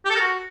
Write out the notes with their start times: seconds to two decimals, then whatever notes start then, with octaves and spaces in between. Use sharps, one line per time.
0.05 G4
0.10 A4
0.15 A#4
0.20 F#4